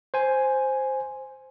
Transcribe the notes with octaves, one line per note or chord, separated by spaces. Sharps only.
C5 G#5